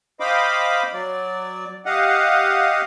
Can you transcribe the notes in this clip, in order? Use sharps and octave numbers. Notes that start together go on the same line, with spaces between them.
C5 D#5 F5 G5 B5 D6
F#3 D5
G4 D#5 F5 F#5